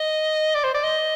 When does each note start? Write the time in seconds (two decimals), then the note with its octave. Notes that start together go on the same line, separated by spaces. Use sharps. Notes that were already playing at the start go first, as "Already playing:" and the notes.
Already playing: D#5
0.55 D5
0.64 C5
0.74 D5
0.84 D#5